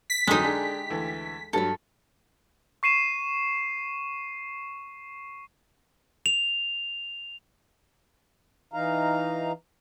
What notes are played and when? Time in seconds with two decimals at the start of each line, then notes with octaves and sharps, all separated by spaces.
0.10 B6
0.27 F2 D3 F#3 G#3 D#4 G4 C6 D#6
0.43 D4 G#4 A4
0.90 D2 E3
1.53 G2 F#3 A4 B5
2.83 C#6 C7 D#7 E7
6.26 F7
8.73 E3 D#4 F5 A#5